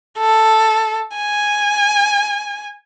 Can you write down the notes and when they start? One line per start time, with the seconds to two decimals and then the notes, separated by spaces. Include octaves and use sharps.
0.18 A4
1.17 G#5